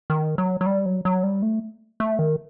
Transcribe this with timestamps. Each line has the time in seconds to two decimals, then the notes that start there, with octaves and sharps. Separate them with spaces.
0.10 D#3
0.38 F#3
0.61 F#3
0.66 G3
0.86 F#3
1.05 F#3
1.23 G3
1.42 A3
2.00 A3
2.19 D#3